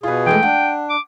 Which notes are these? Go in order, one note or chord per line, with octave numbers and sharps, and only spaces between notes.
B2 F4 G#4 B4
E3 G#3 A3 G5
D4 F#5
D6